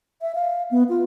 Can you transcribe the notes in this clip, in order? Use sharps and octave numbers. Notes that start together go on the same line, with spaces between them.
E5
F5
B3
F4